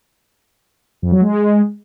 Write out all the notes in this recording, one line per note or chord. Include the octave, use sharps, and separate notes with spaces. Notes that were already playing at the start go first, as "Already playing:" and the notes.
F2
F#3
G#3